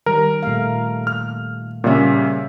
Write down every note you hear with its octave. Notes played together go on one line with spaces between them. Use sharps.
D#3 G3 A#4
A#2 A3 F5
F6
A#2 C#3 G3 C#4 E5